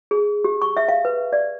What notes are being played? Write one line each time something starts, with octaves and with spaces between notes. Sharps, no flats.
G#4
G4
C#6
E5
F5
B4
D5